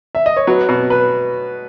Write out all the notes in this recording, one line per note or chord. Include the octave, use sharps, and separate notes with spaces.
E5
D#5
C#5
F#3 B4
B2
B4